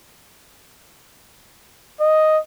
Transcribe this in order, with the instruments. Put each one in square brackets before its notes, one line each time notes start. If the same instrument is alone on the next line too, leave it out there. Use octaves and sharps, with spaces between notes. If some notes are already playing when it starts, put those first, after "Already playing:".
[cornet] D#5